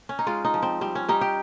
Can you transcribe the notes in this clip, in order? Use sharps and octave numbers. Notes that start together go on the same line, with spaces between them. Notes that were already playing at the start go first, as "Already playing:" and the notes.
C#4
D#4
G#3 F4
D#4
F3
C4
G3 C4
C#4
G3 D#4
G4